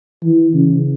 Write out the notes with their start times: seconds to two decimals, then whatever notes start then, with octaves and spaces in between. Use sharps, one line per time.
0.24 E3
0.54 C#3